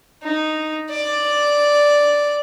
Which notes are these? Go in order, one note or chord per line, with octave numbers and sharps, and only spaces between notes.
D#4
D5